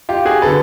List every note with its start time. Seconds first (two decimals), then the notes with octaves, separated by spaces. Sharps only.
0.09 F4 G4
0.25 F#4 G#4
0.42 D3 A4 B4